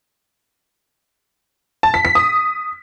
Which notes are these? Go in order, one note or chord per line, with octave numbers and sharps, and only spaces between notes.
A5
B6
B6
D#6